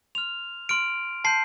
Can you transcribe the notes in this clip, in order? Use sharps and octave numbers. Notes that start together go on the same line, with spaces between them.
C6 F6 F7
C6 F6 D7
A5 C6 G6 C7